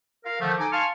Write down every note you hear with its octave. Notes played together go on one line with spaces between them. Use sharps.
A#4 F5
D3 D#3 F3 G3 A3
D#4 A4 G#5 D6
F5 G#5 A5 C6 C#6 F6